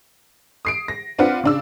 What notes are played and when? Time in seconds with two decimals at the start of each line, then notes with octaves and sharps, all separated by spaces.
0.65 D#6 C7 D7
0.88 A#6
1.19 C4 D4 F4 B4 F#5
1.44 C#3 D4 E6